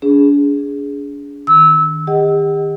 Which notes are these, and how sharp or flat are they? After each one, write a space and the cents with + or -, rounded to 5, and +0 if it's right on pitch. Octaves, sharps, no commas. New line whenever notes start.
D4 -40 G#4 +0
D#3 +0 E6 -20
G4 +40 D#5 +0 F#5 +30